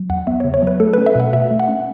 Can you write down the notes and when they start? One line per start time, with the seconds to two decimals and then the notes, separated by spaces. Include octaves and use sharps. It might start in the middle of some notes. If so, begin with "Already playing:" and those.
Already playing: F#3
0.10 E2 F#5
0.27 B3 E5
0.40 C#5
0.45 C#3
0.54 C#5
0.63 F#3 B4
0.80 A3 A4
0.93 B4
0.98 C#4
1.06 E5
1.15 B2 F#5
1.33 B2 E5
1.51 A3
1.60 F#5
1.68 C#4